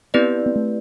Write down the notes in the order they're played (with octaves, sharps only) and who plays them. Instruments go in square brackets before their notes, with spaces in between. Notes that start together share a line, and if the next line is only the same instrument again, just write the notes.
[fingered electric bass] B3 [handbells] C4 E4 G4 B4 D5
[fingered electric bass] B3
A3